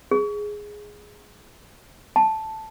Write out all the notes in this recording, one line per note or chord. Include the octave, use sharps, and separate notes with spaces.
G#4
A5